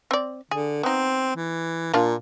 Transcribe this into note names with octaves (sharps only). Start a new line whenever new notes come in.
C4 D5
D3 G#4
B3 C4 D#4
E3
A#2 A#3 D4 F4